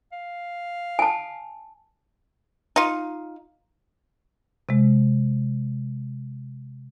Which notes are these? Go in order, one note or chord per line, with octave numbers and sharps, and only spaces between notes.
F5
G#5 A5
D#4 F4
C3 G#3